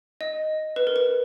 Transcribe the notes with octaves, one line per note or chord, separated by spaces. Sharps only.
D#5
B4
A#4
B4